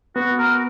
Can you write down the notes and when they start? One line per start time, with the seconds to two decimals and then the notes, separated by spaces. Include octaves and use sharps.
0.15 B3 F#4
0.39 A#4